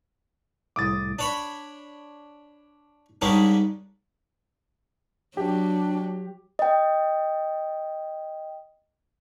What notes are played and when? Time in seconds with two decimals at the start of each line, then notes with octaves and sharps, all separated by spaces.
0.76 C2 A2 A3 D6 D#6 A6
1.19 D4 C#5 B5
3.22 G#2 G3 G#3 A#3 C#4 D4
5.37 F#3 D4 G4
6.59 D#5 G5